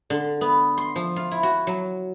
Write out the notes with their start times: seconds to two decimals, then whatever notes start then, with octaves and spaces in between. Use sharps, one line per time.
0.10 D3
0.41 B3
0.78 C6
0.96 F3
1.16 F4
1.31 E4
1.43 F#4
1.67 F#3